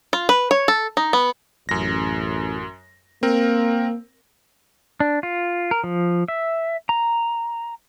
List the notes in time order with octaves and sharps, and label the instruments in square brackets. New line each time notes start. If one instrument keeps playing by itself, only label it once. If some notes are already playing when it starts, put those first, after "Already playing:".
[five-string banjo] F4
B4
C#5
A4
D#4
B3
[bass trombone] A1 [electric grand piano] F#2 A#6
[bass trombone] A#3 [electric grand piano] C4 A#4
[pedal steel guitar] D4
F4
A#4
F3
E5
A#5